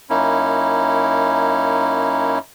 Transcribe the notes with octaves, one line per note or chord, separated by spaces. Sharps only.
F#2 A#3 C#4 D#4 E4